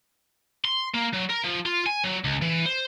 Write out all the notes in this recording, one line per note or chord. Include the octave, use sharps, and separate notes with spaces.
C6
A#3
F#3
A#4
F3
F4
G#5
F#3
C#2
E3
C5